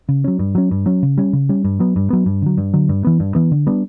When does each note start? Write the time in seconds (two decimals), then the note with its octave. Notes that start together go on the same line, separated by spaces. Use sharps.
0.09 C#3
0.24 F#3 C#4
0.39 G2
0.55 F#3 C#4
0.71 G2
0.86 F#3 C#4
1.03 C#3
1.18 G3 C#4
1.33 C#3
1.49 G3 C#4
1.65 G2
1.80 F#3 B3
1.96 G2
2.10 F#3 B3
2.26 G2
2.42 D3 F#3
2.58 G2
2.74 D3 F#3
2.89 G2
3.05 E3 B3
3.20 G2
3.35 E3 B3
3.52 D3
3.67 G3 B3 D4